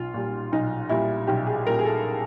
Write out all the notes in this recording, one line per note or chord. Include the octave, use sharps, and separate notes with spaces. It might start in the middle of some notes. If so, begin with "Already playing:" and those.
Already playing: B1 F4
A#2 G3
B1 D#4
A#2 G3 E4
B1 G4
G#4
A#2 G3 A#4
G#4
A4